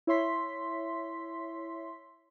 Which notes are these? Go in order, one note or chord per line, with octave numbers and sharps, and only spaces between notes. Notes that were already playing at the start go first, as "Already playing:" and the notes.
E4 C#5 E5 C6 B6